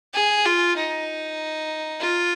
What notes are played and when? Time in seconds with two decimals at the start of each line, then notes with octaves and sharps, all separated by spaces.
0.14 G#4
0.46 F4
0.76 D#4
2.01 F4